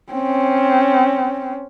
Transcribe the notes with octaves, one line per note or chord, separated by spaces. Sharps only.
C4 C#4